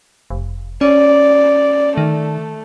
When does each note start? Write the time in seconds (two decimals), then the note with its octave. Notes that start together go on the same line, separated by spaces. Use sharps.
0.30 F1
0.81 C#4 D5
1.97 D#3 A3